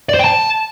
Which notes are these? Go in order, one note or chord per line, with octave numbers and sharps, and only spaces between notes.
D5
C5
G5
A5